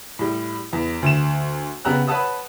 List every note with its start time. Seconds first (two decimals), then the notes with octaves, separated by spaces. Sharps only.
0.19 A2 G3
0.73 E2
1.03 D2 E7
1.85 C#3 B3 G4 A#5 E6 F#6
2.08 B4 C#5 F#5 A5 D#6 E6